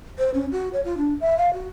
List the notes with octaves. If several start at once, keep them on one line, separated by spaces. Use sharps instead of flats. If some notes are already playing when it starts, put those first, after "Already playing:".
C5
C#4
F#4
C#5
F4
D4
E5
F5
F#4